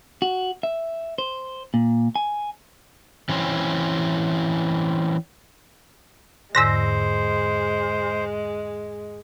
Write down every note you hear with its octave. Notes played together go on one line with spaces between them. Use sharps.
F#4
E5
C5
A#2
G#5
E3 C4 C#4
E2 G#2 D3 G#3 C5 E6 A#6